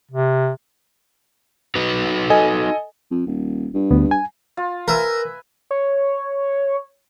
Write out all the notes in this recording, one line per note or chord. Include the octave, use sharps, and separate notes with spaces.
C3
D#4 F#4 B4
A4 D#5 G#5
F2
D#1
G2
D2 B3
G#5
F4
A#4 B4 E5 G#5
C#5